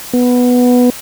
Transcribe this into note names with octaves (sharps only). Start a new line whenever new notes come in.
B3